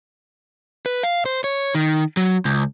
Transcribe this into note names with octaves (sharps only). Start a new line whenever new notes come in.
B4
F5
C5
C#5
D#3
F#3
C#2